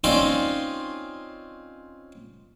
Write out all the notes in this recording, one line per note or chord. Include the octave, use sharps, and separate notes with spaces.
C4 C#4 D#4 F4 D5